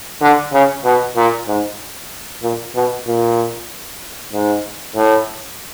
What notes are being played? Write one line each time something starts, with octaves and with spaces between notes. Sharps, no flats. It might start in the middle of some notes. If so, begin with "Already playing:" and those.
D3
C#3
B2
A#2
G#2
A#2
B2
A#2
G#2
A2